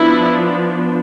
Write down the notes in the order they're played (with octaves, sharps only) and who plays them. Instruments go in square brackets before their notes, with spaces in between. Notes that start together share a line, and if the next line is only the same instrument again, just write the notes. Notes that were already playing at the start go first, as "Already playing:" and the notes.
Already playing: [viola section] F3 B3 D4 E4